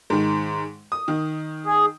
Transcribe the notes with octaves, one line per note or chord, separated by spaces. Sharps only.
G#2 D#3
D#6
D#3
G#4